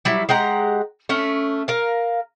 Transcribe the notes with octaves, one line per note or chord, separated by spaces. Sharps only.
F#3 G3 E4
G#3 G4 F#5 A#5
A3 C#4
A#4 F5